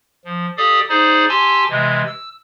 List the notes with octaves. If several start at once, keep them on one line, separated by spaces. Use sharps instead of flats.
F3
G4 A4 D5 F5 D#6
D#4 G#4 C5 D5
G4 G#5 A5 C6 D6 E6
C3 E3 G#3
E6